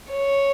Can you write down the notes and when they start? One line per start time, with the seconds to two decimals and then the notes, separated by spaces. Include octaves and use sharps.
0.12 C#5